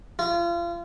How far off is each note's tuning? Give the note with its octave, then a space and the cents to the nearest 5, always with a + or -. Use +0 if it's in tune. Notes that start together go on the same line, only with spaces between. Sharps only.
F4 -35